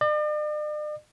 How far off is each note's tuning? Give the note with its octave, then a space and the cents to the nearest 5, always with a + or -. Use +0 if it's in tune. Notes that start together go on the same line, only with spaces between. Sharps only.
D5 +45